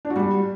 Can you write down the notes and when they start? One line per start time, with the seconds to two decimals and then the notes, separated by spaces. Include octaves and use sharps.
0.05 D4
0.10 F#4
0.16 G3